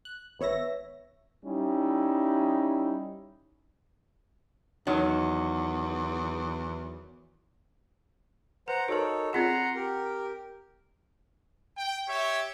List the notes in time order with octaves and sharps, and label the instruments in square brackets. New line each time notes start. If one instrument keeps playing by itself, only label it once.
[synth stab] F#6
G#1 B3 C#5 E5 A#6
[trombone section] G3 C#4 D#4 E4
[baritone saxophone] E2 [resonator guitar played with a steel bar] D#3 F#3
[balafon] B4 [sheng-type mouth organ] C5 F#5 A#5
[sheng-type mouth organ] D#4 A4 C#5 [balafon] F#4 A#4
[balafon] C4 F4 G#4 [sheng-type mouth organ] F#5 A#5 C6
[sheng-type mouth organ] G4 A#4
[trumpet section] G5
[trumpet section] G4 E5 [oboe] C#5